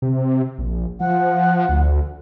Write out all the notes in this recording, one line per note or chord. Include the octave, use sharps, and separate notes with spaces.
C3
A#1
F3 F#5
D2